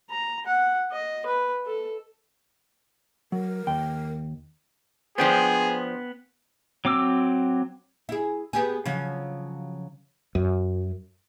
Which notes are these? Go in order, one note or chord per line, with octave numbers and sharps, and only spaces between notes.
A#5
F#5
D#5
B4
A4
F#3 A#4
D#2 G5
F3 B3 D4 G#4 C5 G5
F#3 C4 D6 E6
E4 G#4
B3 G4 G#4
C#3 F3 F#3
F#2